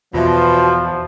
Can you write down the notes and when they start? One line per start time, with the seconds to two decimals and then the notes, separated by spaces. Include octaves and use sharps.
0.14 E2 B2 F3 F4 D5 E5